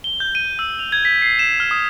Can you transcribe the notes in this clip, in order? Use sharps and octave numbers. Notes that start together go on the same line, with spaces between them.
G7
G6
D#7
E6
F7
G#6
B6
C7
E7
F6
D#6